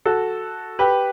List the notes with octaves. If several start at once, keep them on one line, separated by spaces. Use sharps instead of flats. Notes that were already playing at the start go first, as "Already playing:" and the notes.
F#4 A4
G4 B4